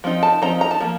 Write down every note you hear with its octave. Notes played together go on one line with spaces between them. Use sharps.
F3 C4 D#4
A5
F3 C4 D#4 A#5
A#5
A5
F3 A#3